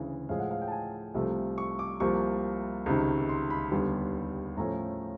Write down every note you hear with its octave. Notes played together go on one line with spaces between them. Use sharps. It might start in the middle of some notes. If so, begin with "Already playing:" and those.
Already playing: D2 C#3 E3 G#3
A2 F3 G#3 F5
F#5
F5
G5
A5
G#5
C2 C3 F3 A3
C#6
D6
C2 C3 F3 A#3 C#6
C#2 C3 D#3
C6
B5
D#2 D3 G3 B3 C6
A2 F3 A3 C#4 A#5